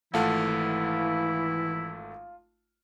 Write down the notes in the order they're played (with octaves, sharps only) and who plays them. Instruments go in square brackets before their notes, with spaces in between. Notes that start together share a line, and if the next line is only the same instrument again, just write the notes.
[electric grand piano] G#1 A3 F#5 [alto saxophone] E3 [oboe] E4 [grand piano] F4 F5 A5